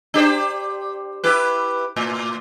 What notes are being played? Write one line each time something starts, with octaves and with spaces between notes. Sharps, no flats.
D4 G4 C5
E4 G4 B4
A2